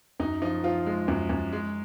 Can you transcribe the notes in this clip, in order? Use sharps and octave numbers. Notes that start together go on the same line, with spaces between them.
F#2 D#4
F3 D#4
F3 F4
G#3
F#2
F#2
G#3